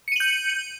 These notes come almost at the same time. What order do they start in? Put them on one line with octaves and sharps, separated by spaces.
C#7 D#7 F#7 G6